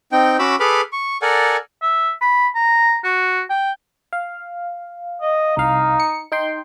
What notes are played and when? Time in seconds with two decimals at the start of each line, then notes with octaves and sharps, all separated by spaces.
0.12 C4 D#4 G5
0.39 C#4 F#4 B5 D6 E6
0.60 G#4 A4 B4 B5 D6 F6
0.92 C#6
1.22 A4 A#4 D5 F#5 G#5
1.82 E5
2.21 B5
2.55 A#5
3.04 F#4
3.50 G5
4.13 F5
5.22 D#5
5.57 C2 D#4 F5
6.00 C#7
6.32 D#4 G5 C6